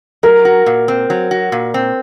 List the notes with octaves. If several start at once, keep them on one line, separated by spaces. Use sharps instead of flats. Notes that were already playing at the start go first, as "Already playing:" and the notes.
F#3 A#4
F#4
A#2
C4
F#3
F#4
A#2
C4